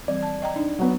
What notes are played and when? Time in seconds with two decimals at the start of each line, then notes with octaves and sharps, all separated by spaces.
0.08 E3 G3 C4 D5
0.22 A5
0.42 D#5 G5 A#5
0.56 D4 D#4
0.79 F#3 B3